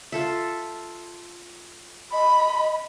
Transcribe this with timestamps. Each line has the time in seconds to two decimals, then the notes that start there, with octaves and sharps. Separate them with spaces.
0.12 F4 A4 E5
2.12 D#5 B5